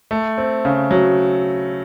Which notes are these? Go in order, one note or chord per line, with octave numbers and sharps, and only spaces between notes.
A3
C4
C#3
F#3